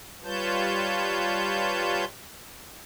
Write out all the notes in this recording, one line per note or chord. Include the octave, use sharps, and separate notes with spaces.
G3 F4 B4 C#5 A5 G6